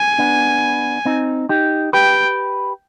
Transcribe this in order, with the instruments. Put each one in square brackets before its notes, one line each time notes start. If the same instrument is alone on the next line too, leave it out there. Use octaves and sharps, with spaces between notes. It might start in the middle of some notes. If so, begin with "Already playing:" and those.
Already playing: [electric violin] G#5
[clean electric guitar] B3 D4
C4 D#4
D#4 G4
[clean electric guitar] G4 B4 [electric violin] G5